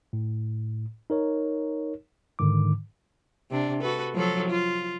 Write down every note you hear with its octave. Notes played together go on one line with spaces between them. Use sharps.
A2
D#4 A#4 C#5
G#2 D3 D#3 D6
C3 D4
F#4 A4 B4
F3 F#3 A4
F4